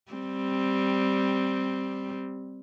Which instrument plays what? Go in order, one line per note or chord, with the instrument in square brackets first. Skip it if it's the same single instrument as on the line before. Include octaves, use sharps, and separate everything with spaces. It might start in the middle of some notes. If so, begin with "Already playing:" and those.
[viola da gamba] G3 C4